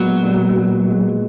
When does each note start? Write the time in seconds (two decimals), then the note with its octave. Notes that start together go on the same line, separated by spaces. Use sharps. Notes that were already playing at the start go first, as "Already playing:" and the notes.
Already playing: A#2 F#3 G#3 B3
0.23 A#2
0.56 A#2
0.88 G#3